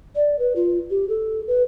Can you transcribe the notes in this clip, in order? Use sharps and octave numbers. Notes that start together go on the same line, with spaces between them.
D5
B4
F4
G4
A4
B4